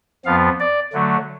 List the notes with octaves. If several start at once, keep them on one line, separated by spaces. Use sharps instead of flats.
F2 F3 B3 F5
D5
D3 F#3 A3